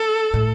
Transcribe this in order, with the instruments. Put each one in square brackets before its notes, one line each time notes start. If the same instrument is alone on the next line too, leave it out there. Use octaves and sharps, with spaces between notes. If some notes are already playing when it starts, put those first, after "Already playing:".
Already playing: [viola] A4
[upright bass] A2